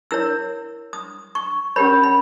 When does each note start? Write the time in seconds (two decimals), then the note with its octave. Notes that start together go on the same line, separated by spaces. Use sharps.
0.11 E4 A#4 C#5 E6
0.93 D#6
1.35 C#6
1.76 C#4 G4 A#4 C#5 B5
2.03 B5